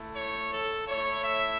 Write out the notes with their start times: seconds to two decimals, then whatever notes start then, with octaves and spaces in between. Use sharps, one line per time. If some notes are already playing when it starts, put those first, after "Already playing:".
Already playing: A3 E4
0.16 C#5
0.52 A4
0.87 A3 E4 C#5
1.24 E5